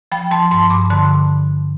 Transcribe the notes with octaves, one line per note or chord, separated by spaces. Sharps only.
F3 G5 B5
F3 A5 C6
G2 A5 C6
G2 B5 D6
D3 A5 C6